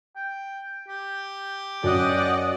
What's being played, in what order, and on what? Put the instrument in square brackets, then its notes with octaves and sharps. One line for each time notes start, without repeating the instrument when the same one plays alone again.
[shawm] G5
G4
[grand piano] F#2 [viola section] D5 D#5 F#5